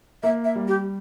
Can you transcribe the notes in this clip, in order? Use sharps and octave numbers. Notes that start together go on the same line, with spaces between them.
A#3 E5
E5
G3
G4